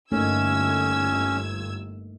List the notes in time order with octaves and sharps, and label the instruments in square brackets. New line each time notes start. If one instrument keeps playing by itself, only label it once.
[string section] G1 E6 G#6 [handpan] A3 A#3 D#4 [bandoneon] C#4